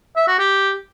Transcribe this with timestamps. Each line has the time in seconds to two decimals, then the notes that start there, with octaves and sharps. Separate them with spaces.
0.16 E5
0.27 F#4
0.39 G4